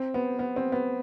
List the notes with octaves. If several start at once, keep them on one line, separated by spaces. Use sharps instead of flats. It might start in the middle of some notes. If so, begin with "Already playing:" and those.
Already playing: C4
B3
B3
C4
B3